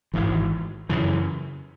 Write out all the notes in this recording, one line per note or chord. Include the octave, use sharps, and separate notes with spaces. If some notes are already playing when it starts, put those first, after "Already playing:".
G#1 G#2 E3
F#2 C#3 E3